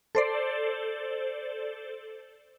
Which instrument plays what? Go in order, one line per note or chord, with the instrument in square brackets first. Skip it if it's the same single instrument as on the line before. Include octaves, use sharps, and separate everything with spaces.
[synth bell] A4 C5 D5